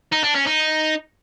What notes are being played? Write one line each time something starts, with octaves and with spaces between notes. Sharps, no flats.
D#4
D4
C#4
D#4